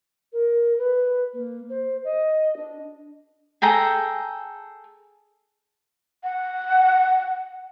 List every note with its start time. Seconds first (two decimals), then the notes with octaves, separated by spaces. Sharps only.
0.32 A#4
0.77 B4
1.33 A#3
1.69 C5
2.04 D#5
2.56 D4
3.62 G#4 A4 G5 A#5
6.24 F#5